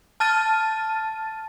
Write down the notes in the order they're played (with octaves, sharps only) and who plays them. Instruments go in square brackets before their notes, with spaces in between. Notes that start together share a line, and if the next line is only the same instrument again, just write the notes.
[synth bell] A5 F6 A6 D#7